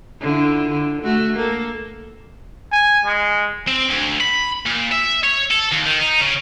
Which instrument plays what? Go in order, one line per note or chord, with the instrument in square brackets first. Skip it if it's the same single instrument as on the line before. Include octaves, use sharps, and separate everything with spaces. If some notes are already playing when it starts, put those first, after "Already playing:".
[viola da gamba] D3 E4 F4
D3
A3 F#4
A#3 A4
[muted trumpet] G#5
G#3
[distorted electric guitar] C4
D2
B5
A#2
E5
C#5
A4
D#2
D#3
D#4
C#3